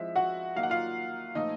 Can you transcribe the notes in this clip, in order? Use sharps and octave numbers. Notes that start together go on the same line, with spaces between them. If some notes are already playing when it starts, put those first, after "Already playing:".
Already playing: F3 G#3 C4 E4 E5
F#4 F#5
F#3 A#3 D#4 F5
F#5
F4 F5
A#2 F3 A3 D#4 D#5